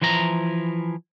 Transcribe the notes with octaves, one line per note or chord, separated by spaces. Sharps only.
E3 F3 E4 A#5